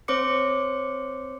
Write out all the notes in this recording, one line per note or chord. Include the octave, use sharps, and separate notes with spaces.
C4 C5 C#5 D6 C#7